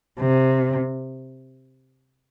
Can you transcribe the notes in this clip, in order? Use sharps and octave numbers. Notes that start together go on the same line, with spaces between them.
C3